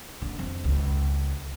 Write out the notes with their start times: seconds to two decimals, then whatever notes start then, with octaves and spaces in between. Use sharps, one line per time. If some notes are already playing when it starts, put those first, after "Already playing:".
0.22 D3
0.39 F2
0.64 C#2